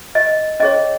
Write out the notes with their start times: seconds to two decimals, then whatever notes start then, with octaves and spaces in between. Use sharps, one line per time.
0.15 D#5
0.60 C#4 G#4 C#5 D#5